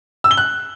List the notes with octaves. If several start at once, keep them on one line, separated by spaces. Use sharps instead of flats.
E6
G7
F#6